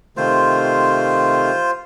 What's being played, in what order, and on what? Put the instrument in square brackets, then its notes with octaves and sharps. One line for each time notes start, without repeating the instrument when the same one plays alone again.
[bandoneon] C3 D#3 A3 [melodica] F4 C5